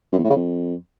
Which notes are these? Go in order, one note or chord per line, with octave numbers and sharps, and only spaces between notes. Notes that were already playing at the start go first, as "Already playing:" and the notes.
F#2
E2
A2
C#3
F2